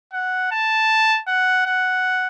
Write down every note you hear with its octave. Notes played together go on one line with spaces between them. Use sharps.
F#5
A5
F#5
F#5